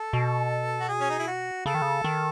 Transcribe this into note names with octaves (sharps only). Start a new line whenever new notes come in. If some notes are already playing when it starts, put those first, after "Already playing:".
Already playing: A4
B2
F#4
G#4
C#4
D#4
E4
F#4
C#3 A4
D#3
C#3
D#3